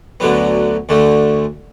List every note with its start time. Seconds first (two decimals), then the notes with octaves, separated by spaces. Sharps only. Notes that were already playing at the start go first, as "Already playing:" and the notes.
0.20 D2 D3 F#3 B3
0.89 D2 D3 A3